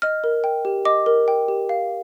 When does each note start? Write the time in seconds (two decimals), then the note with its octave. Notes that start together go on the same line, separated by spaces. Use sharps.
0.02 D#5 F6
0.24 A#4
0.44 G5
0.65 G4
0.85 D#5 D6
1.06 A#4
1.28 G5
1.48 G4
1.69 F5